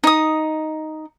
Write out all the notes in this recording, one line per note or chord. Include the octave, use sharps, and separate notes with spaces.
D#4 D#6